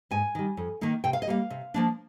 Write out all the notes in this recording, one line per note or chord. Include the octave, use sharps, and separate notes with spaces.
G#2 G#5
D#3 G3
F2
D#3 A#3 D#4
C3 G5
F5
D#5
G3 A#3 F5
C3
F3 A#3 D4